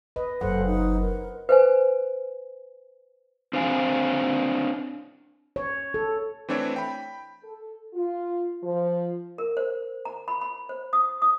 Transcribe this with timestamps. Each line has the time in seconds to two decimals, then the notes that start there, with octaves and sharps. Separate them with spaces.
0.16 B4 D#5
0.41 F#1 A4 C5 F#5
0.66 D#4
1.00 A#4
1.49 B4 C5 G#5
3.53 C4 D4 C5 F5 G#5
5.56 C#5
5.94 A4
6.49 E3 A3 C4 D4 E4 C#5
6.76 G5 B5
7.43 A4
7.94 F4
8.63 F3
9.38 A#4
9.57 C5
10.05 A#5
10.28 B5
10.41 B5
10.69 C5
10.93 D#6
11.22 D#6